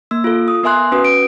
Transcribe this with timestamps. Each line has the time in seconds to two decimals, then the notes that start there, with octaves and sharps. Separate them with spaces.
0.11 A#3 E6
0.24 F4 A4
0.48 D#6
0.63 B3 A#4 E5 G#5 C6 F#6
0.92 C#4 F#4 B4 D#6
1.05 D7